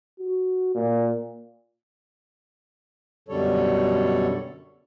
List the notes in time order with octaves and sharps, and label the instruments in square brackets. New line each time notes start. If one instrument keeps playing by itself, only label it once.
[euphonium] F#4
A#2
[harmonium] F#2 B2 D3 G3 A4 C#5